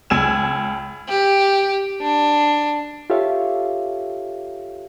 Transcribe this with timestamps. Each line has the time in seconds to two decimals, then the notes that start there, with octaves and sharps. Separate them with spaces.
0.10 C#2 G#5 E6 E7
1.08 G4
2.01 D4
3.10 F4 G4 A4 C#5 E5 F5